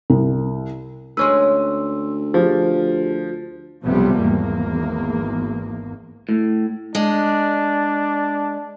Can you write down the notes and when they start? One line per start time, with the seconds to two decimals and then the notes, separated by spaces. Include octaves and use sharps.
0.10 C2
1.17 D2 G#3 C#4 B4 C6 E6
2.34 F3 F4 G4 G#4
3.84 B1 C3 F3 G3 B3
4.22 G#1 E2 A#3
6.29 A2
6.95 G#3 D4